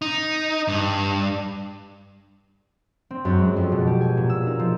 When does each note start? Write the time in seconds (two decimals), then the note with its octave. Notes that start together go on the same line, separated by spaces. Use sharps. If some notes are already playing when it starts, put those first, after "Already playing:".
0.02 D#4
0.68 G2
3.11 C4
3.25 F#2
3.39 G#3
3.56 F2
3.72 B2
3.87 G4
4.01 G#5
4.17 A#2
4.30 E6
4.47 D#4
4.59 F3